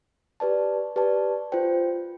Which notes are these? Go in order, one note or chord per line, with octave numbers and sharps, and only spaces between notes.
G4 B4 D5 A5
G4 B4 D5 A5
F4 C5 G5